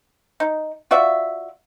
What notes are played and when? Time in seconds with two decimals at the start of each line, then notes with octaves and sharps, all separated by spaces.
0.40 D#4
0.91 F4 F#4 D5 E5